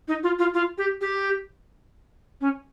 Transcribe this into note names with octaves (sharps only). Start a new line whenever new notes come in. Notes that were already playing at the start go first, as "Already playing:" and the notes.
D#4
F4
F4
F4
G4
G4
C#4